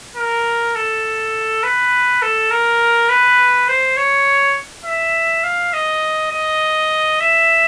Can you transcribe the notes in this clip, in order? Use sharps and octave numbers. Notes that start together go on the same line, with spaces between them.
A#4
A4
B4
A4
A#4
B4
C5
C#5
E5
F5
D#5
D#5
E5